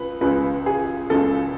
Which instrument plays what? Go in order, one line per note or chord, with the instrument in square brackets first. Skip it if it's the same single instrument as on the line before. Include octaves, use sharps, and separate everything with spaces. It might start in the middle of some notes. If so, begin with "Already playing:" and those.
Already playing: [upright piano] C#2 B4
C#2 C#3 G#3 B4
G#4
C#2 C#3 G#3 A4